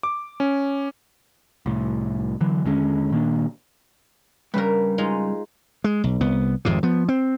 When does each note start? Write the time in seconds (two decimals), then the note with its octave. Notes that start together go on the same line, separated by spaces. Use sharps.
0.03 D6
0.40 C#4
1.66 C2 A2
2.41 D3 E3 F#3
2.65 D#2 D3 G#3 C#4
3.11 A#2 D#3 A#3 D4
4.54 G2 C#3 G3 A#4 B4
4.98 G#3 D#4 F4
5.84 G#3
6.04 B1
6.21 C2 B3
6.65 G#1 F2 G#2 C3
6.83 F3 B3
7.09 C4